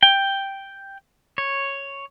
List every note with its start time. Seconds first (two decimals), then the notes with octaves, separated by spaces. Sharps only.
0.03 G5
1.38 C#5